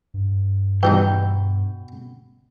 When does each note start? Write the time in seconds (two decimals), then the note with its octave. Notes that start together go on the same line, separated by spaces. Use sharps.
0.14 G2
0.83 B2 E3 G3 D#4 G5